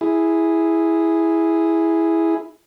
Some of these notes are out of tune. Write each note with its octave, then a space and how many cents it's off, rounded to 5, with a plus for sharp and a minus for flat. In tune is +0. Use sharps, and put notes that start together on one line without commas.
E4 +0 G#4 +0